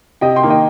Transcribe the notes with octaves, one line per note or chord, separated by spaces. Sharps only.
C3 D#5 G5
G5 C6
D#3 A#3
D#5 G5